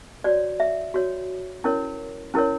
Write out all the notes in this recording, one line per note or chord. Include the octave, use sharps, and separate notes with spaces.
F#4 C#5 D5
E5
F#4 C#5
C#4 E4 A#4 C#5
C#4 E4 A#4 C#5